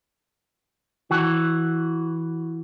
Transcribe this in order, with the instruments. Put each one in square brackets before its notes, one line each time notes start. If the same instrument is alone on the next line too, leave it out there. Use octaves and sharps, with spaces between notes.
[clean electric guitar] E3 F#4